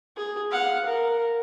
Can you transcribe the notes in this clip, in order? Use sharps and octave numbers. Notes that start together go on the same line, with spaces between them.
G#4
F5 F#5
A#4